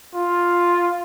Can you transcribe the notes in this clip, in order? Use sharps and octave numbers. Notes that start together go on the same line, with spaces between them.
F4